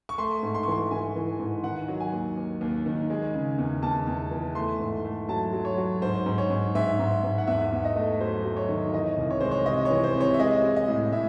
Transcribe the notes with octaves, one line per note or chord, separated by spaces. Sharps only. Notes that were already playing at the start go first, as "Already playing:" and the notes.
C#6
A3 C6
G#2
C6
C#6
E3 C6
E3 G#5
E3
G#2
D#3 F#5
F#3
G#5
D#2
D#2
D#2
D#3
G#3
C#3
E2
E2 A5
E2
E3
A3 C6
G#2
A3
F#3 A5
F#3
C#5
F#3
G#2 C5
G#2
C#5
G#2
G#2 E5
G#2
G#2
F#5
E2 E5
E2
D#5
A3
F#3 C5
F#3
C#5
D#3
E3 D#5
C2
C#5
G#3 C5
C#5
C3 D#5
C#5
E3
C5
C3
C#5
E5
G#3 D#5
G#3
D#5
A2
A2 E5